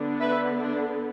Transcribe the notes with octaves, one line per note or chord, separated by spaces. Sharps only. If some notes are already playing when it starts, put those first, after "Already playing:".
Already playing: D3 B3 D4
B4 E5
D4